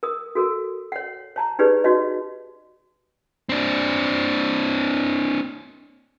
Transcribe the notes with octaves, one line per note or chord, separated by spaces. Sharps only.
A#4 D#6
F#4 A4 A#4
C#5 F#5
C#5 A5 A#5
D#4 G4 G#4 B4 C#5 D5
D#4 F#4 C#5 D#5
C4 D4